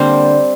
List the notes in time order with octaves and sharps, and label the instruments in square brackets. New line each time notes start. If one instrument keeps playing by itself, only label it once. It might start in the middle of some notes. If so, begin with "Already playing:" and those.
Already playing: [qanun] D3 G3 A#3 C4 C5